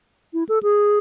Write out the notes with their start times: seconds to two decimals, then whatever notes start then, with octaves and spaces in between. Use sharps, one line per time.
0.33 E4
0.49 A4
0.63 G#4